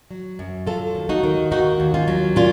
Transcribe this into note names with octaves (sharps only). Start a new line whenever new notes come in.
F#3
F#2
F#3 F4 A4
D#2
D#4 F#4
D#3
D#2 D#4 F#4
D#2
C#4 F4
F#3
A#2 C#4 F4